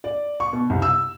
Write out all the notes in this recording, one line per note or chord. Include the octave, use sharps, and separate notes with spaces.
D5
C#6
B2
C2
E6